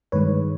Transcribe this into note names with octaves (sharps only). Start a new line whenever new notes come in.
G2 D#3 G#3 B4 C#5